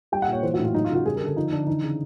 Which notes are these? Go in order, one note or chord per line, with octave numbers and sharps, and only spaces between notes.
G3 G5
F#5
A#2
C#5
E3 C5
F#4
A2 F4
F#3 D#4
F4
C#3 F#4
G3 G#4
A#4
D3
A4
F3 D#4
D3 D4
E3 D#4
C#3